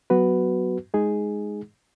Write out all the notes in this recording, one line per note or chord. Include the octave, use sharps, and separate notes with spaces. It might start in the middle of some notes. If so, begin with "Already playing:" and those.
F#3 B3 F#4 B4
G#3 D#4 G#4